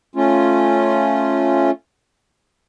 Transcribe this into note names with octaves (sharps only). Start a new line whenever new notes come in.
A3 C#4 F4